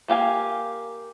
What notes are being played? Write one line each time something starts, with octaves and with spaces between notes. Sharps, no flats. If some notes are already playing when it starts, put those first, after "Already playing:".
A#3 G4 F5 G#5